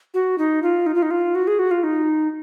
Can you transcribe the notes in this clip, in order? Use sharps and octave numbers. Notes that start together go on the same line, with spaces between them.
F#4
D#4
F4
D#4
F4
D#4
F4
F#4
G#4
F#4
F4
D#4